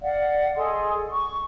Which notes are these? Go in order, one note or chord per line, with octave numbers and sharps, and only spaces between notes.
D5 F5 F#5
G#4 A4 D#5 C6
C#6